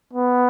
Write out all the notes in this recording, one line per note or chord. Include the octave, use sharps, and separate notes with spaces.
B3